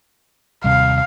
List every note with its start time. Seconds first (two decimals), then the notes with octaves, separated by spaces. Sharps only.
0.64 D#2 C3 G3 F5